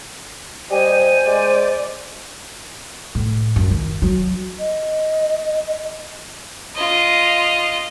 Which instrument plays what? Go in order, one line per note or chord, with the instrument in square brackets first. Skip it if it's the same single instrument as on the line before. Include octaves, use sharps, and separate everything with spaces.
[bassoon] G3 [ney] C5 [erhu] D#5 [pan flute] G#5
[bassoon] G#3 [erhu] D5
[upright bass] A2
F#2
D#3
F#3
[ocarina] D#5
[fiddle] F4 D#5